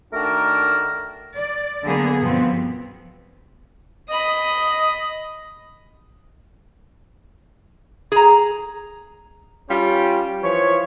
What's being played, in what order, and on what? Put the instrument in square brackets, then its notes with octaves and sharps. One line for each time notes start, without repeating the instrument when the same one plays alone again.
[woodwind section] D#3 A3 D4 F#4 A#4
[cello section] D5
D3 F#3 A#3 B3 G#4
G2 B2 F3 B3 C4
[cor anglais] D#5 [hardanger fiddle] B5 D#6
[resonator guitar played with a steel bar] G#4 A#5
[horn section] G3 C#4 F4 G4
E3 F3 C#5